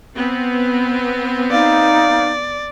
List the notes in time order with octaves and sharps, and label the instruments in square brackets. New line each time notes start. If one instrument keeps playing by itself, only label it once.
[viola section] B3 C4
[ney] D#4 [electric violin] D5 [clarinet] F5